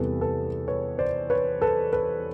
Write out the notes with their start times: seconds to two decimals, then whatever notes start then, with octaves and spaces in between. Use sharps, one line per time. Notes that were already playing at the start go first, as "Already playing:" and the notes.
Already playing: E2 C3 E3 G3 A4 B4
0.21 A4 B4
0.68 B4 C#5
0.99 C5 D5
1.30 B4 C#5
1.61 A4 B4
1.93 A4 B4